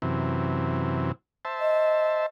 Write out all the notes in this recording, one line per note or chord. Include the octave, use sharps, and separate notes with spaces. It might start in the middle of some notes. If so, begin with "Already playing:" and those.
F#2 C3 E3
C5 E5 A5
D#5